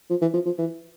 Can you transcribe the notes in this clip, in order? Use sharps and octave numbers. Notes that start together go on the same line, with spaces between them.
F3
E3
F3
F3
E3